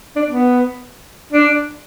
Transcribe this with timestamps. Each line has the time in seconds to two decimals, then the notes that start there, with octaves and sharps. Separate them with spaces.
0.16 D4
0.27 B3
1.33 D4